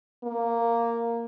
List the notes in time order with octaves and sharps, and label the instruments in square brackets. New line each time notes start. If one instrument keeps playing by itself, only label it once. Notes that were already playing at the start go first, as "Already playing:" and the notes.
[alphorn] A#3